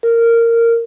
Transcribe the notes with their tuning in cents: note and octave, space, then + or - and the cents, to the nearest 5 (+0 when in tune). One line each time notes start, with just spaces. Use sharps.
A#4 -15